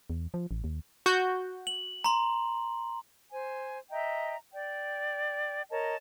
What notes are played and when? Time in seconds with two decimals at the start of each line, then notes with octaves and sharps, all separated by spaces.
0.10 E2
0.34 F3
0.51 A1
0.64 D#2
1.06 F#4 G6
1.67 F#7
2.04 A#5 C6
3.32 C5 G#5
3.91 D#5 E5 G5 A#5
4.53 D5 G5
5.70 A#4 C#5 D#5 A5